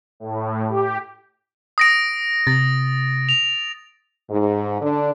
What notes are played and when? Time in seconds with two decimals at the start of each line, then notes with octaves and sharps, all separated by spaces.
0.20 A2
0.68 G4
1.78 D#6 A#6 D7
2.47 C3 A6
3.29 F7
4.30 G#2
4.82 D3 D4